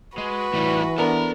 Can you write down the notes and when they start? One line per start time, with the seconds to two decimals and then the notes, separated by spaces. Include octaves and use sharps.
0.18 G#3 F#4 B4
0.53 A2 E3 G3
0.98 B3 D4 A4 A#4 A#5